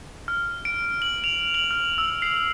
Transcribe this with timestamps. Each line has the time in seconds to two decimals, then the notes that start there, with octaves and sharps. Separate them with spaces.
0.28 F6
0.65 D7
1.02 F#7
1.24 F7
1.54 F#7
1.71 F6
1.98 E6
2.22 C7